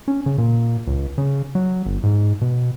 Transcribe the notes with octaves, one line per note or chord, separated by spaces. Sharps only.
C#4
C#3
A#2
C#2
C#3
F#3
G1
G#2
B2